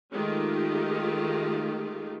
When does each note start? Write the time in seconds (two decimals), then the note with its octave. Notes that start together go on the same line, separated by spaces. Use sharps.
0.13 D#3 G#3 A3 F4 G4